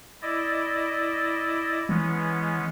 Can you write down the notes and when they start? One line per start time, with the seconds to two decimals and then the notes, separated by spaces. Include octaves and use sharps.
0.22 E4 D5 D#5
1.89 E3 G#3 B3 C#4